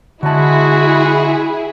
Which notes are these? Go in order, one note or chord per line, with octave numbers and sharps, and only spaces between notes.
D3 G#3 E4 F#4 G#4 A5